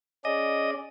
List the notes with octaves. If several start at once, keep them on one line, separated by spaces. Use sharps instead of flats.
C#4 G#4 D5 D#5